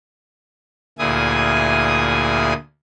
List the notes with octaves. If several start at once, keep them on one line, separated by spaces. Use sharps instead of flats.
D2 A#2 E4 G#4 G#5 D#6